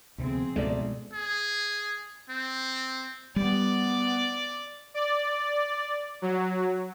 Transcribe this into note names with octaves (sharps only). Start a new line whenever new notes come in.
D2 C3 F3 B3 C4 G#4
C#2 G#2 B2 G#3 A3 D5
G#4
C4
G3 B3 D5
D5
F#3